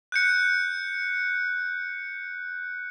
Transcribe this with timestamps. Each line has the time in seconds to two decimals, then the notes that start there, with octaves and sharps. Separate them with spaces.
0.12 F#6 G6 C#7